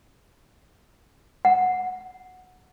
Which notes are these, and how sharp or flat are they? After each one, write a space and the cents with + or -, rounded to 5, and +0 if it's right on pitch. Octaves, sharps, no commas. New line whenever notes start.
F#5 -15